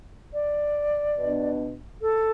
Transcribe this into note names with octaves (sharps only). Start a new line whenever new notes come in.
D5
B2 B3 D4
A4